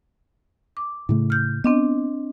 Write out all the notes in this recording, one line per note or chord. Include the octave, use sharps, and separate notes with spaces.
D6
A2 C#3 A3
F6 G6
B3 C4 D4 D#5